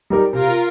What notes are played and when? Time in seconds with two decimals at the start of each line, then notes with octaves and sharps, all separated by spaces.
0.10 G3 D#4 G4 A#4
0.33 C3 F4 A#4